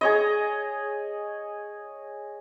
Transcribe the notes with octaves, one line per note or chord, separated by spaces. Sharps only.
G#4 C#5 D#5